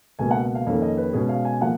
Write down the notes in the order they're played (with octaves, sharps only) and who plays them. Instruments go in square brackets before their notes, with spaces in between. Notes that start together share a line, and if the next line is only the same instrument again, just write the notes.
[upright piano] C#2 B2 A#3 G#5
F#5
F5
F2 D#3 A#3 C#4
D#5
B4
B2 G#3 C#4 G#4
F5
G#5
F3 A#3 F#5